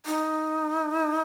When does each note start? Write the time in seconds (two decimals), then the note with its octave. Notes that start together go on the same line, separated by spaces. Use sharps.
0.06 D#4